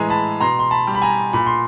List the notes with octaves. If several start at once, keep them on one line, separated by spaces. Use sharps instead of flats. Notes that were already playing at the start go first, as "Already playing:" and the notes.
Already playing: A2 E3 G#3 G#5 A#5
A5 B5
B2 A#5 C6
C6
A5 B5
G3
B5
G#5 A#5
A#2 B5
C6